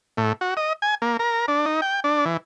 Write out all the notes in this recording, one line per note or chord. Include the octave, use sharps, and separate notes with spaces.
A2
F#4
D#5
G#5
A#3
A#4
D4
D#4
G5
D4
E3